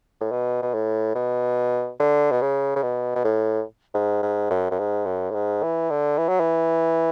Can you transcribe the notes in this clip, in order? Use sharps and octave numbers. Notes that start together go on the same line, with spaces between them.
A2
B2
B2
A2
B2
D3
B2
C#3
C#3
B2
B2
A2
G#2
G#2
F#2
F#2
G#2
F#2
A2
G#2
E3
D3
E3
F#3
E3